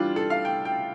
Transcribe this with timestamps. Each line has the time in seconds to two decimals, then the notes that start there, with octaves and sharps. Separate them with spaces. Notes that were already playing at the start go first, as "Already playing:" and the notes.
Already playing: E3 G3 D4 F4
0.16 A4
0.30 F5
0.45 G5
0.65 G5